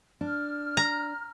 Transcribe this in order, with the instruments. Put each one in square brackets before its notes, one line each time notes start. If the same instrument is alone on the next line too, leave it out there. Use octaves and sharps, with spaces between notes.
[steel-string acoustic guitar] D4 [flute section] F6
[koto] A#5